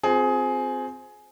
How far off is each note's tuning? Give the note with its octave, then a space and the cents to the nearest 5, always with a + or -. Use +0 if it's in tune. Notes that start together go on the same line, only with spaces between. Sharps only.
C4 -10 F4 +30 G#4 +15